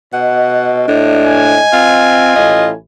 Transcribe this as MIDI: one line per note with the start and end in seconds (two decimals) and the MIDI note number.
0.13 0.88 47
0.13 2.33 75
0.13 0.71 78
0.88 1.60 45
0.88 1.60 62
1.26 2.77 80
1.73 2.32 60
1.73 2.69 65
2.36 2.73 33
2.36 2.73 45
2.36 2.69 75